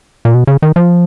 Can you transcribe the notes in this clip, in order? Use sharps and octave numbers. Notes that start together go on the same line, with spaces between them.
A#2
B2
C#3
D#3
F3